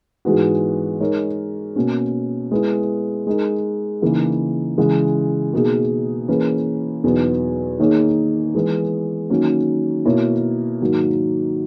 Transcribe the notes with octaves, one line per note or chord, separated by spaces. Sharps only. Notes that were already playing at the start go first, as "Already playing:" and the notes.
G#2 E3 G#3 B3 F#4
G#3 D#4 A#4 C#5
B2 A#3 C#4
G#3 B3 E4
G#3 D#4 A#4
C#3 E3 A#3 D#4
C#3 E3 G#3
B2 A#3 D#4 G#4
E3 A#3 C#4 G#4 B4
E2 B2 F#3 B3 D#4
D#3 A#3 D#4 G#4 C#5
E3 G#3 B3
D#3 F#3 A#3 C#4
B2 A#3 E4 A#4 C#5
G#2 D#3 F#3 A#3